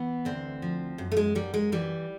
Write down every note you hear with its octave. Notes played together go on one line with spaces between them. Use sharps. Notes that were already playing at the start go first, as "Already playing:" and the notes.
Already playing: E3 B3
D2 C4
F3
F#2
A3
G#3
F#2 G3
G#3
E3 G3